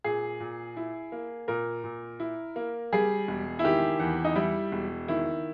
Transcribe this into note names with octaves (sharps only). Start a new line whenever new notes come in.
A#2 G#4
A#2
E4
A#3
A#2 A#4
A#2
E4
A#3
G3 G#4
E1
E4
D#3 G4
E2
D#4
G3 E4
E1
D#3 E4